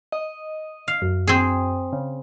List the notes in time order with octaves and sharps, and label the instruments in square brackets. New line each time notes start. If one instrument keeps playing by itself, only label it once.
[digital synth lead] D#5
[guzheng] F5
[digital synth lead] F#2
[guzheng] C4 G#4
[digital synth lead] C#3